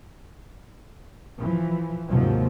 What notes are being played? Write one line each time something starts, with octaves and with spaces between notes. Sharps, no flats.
E3 F3
D#2 G#2 C3 F3 F#3